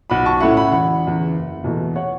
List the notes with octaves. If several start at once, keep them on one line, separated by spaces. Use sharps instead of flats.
B1 F#5 B5
A5 C#6
A2 A3 C#4 E4 F#5 B5
F#5 B5
E1 F#5 B5
E2 C#3
F#1
E2 B2 A3
C#5 F#5